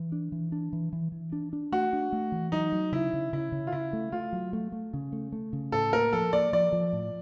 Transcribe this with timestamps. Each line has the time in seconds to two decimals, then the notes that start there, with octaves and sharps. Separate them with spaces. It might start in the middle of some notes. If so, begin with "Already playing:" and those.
Already playing: E3
0.12 D4
0.32 E3
0.52 D4
0.73 E3
0.93 E3
1.12 E3
1.32 D4
1.53 D4
1.72 A3 F#4
1.93 D4
2.13 A3
2.32 E3
2.52 F#3 D#4
2.72 F#3
2.92 C#3 E4
3.13 C#3
3.33 C#3 E4
3.52 C#3
3.67 F4
3.72 C#3 E4
3.93 A3
4.12 A3 F4
4.33 F#3
4.53 A3
4.72 A3
4.93 C#3
5.12 A3
5.32 A3
5.53 C#3
5.72 A2 A4
5.93 A#3 A#4
6.13 F3 A4
6.33 A#3 D5
6.53 F3 D5
6.73 F3
6.93 A2